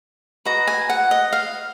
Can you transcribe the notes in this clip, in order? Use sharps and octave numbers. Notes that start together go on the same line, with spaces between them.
F#4 B4 D#5 A#5
G#5
F#5
D#5
F5